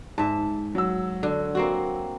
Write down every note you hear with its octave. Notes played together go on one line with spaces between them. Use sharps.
G#2 E5 A5
F#3 E6
D3
A#3 C4 F#4